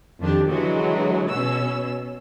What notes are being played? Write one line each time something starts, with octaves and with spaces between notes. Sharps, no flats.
F2 D#3 D4 G4
D3 E3 F#3 G#3
B2 C#4 E6